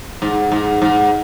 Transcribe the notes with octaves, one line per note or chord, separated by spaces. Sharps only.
G#2
G#2
G#2